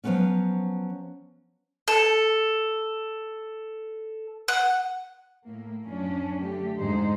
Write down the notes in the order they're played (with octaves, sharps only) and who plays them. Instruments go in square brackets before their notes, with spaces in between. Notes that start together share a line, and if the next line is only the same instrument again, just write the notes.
[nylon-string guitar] F3 F#3 G#3 A3 B3 C#4
[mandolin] A4
F#5
[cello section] A2 A#3
F#2 F3 C#4 D4
D3 A3 G4
F2 G#2 D3 G#3 D#4 C5